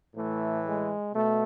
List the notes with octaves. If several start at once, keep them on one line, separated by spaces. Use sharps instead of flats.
A2 E3 A3
G#3
B2 A3